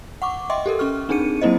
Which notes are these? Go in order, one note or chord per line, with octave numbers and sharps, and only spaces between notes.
F#5 C#6 D6
D#5 E5 G5 C6 D6
G4 A4 A#4
C#4 G4 C#6 F6
C4 D4 D#4 G#4 C#7 D#7
F#3 A#3 C4 E4 C5 D#5